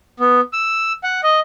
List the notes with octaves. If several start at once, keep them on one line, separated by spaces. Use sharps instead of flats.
B3
E6
F#5
D#5